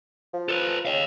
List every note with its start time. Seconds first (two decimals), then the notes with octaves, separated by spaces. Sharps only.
0.33 F3
0.49 A4 B4
0.85 C#3 D#5 F5